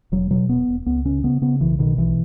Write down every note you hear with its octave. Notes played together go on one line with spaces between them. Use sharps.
E1 F#3
B2 F#3
E1 B3
E1
C#2 B3
C#3 C#4
C#3 B3
C#3 B3
B1 E3
B2 D#3
B1 E3